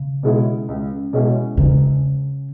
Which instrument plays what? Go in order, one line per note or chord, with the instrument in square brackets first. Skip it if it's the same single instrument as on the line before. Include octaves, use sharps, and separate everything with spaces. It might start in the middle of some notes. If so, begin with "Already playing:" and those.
Already playing: [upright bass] C#3
[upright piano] B2 G#3 C#4 E4
C#2
B2 G#3 C#4 E4
[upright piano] E1 [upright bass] C#3